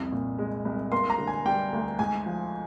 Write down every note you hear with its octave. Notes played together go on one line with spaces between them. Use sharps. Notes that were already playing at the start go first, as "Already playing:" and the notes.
Already playing: C2 F2
A#2
G#3
C2
A#3 C6
A#5
D3
G#5
G3 G5
D2
G#2 G#5
F3